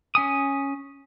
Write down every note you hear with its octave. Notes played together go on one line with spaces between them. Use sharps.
C#4 G#5 D#6